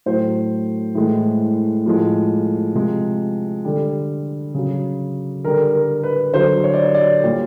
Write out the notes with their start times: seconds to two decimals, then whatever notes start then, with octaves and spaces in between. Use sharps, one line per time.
0.06 A2 F#3 C5
0.95 A2 E3 G#3
1.86 A2 F3 G#3
2.75 C3 F3 G#3
3.65 D3 G3
4.54 C#3 F#3
5.44 D3 G3 A#4
5.75 A#4
6.04 B4
6.34 D3 F#3 C5
6.64 C#5
6.74 D5
6.84 C#5
6.94 D5
7.24 A#2 G3